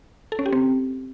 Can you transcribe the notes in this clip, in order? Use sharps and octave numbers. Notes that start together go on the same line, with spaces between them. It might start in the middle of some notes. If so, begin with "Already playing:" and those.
A4
C#4
G4
C4